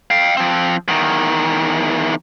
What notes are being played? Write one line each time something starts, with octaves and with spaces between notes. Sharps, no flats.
F5 G5
F3 C4
E2 D#3